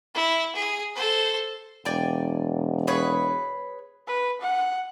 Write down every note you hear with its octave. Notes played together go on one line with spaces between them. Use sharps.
E4
G#4
A4 C5
E1 D5 G5 G#5
G#4 B4 C#5
B4
F#5